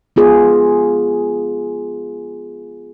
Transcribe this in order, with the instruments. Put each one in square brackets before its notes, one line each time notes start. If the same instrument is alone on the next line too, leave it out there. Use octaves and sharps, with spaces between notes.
[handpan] B3 F4 G#4